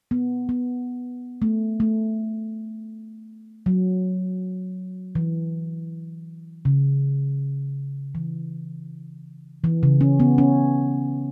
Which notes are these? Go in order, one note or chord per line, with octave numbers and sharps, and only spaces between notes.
B3
B3
A3
A3
F#3
E3
C#3
E3
E3
C#3
C#4
B3
C#4